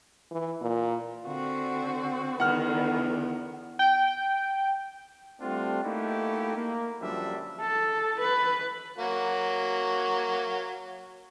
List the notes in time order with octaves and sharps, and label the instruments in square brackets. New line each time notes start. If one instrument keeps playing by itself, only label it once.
[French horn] E3
A#2
[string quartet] D3 C4 F#4
[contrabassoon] E2 [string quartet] D3 D#3 B4 [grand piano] F#5 F6
[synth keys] G5
[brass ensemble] G3 A3 C4 D4 F4 F#4
A3 A#3 D#4 E4 F#4 G4
A#3
F#2 D3 F3 G3 D4 E5
[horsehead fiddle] A4
B4
[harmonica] F#3 A#3 F#4